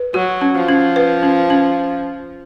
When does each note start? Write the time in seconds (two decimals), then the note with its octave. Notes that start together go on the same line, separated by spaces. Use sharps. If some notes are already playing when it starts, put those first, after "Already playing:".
Already playing: B4
0.14 F#3 F#4
0.41 C#4
0.55 F3
0.69 C#4
0.96 B4
1.23 C#4
1.50 C#4